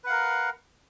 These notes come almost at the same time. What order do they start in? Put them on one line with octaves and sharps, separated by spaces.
B4 F#5 F5 A#4